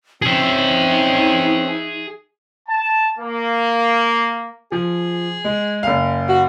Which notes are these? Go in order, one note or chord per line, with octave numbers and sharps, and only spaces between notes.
C4 C#4 D#4 G#4 E5
A5
A#3
F3 G#4
G#3
F#1 F5
F#4